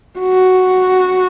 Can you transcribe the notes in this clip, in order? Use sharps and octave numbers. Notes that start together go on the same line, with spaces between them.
F#4